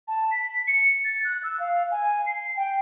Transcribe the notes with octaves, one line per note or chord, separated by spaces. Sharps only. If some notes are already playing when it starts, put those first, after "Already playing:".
A5
B6
C#7
A6
F#6
E6
F5
G#5
C7
G5